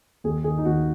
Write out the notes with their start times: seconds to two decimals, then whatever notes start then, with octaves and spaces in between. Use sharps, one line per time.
0.24 D#2 G#4
0.44 D#3 G#4
0.58 D#4
0.65 D#2 F#4